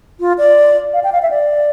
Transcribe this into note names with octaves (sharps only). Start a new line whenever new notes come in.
F4
D5
F5
G5
F5
E5
D5